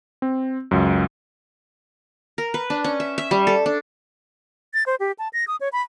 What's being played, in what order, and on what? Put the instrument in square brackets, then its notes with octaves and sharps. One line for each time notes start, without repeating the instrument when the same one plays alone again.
[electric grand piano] C4
C#2 F#2
[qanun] A#4
B4
D4
C#4
E5
E5
G3
A4
D4
[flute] A6
C5
G4
A5
A#6
D#6
C#5
B5